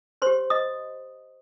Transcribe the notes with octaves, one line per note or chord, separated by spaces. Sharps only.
G4 C5 C#5 C6
D#5 D#6